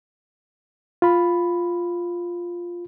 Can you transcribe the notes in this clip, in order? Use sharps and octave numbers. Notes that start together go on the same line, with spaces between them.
F4 B5